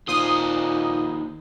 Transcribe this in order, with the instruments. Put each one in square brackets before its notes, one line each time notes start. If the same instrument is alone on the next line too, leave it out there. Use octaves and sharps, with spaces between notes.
[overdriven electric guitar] D#2 C5 [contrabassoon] A#2 [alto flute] D#4 [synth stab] D#6